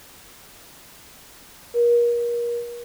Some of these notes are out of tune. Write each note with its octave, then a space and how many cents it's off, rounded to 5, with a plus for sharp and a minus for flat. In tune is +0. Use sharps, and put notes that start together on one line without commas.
A#4 +35